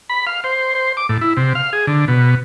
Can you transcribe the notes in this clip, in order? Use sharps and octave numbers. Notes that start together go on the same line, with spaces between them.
B5
F5
C5
C5
D6
A2
E4
C3
F5
G#4
D3
B2